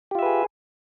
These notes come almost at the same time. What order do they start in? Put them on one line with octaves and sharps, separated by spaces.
G4 F4 E5 B4 G#4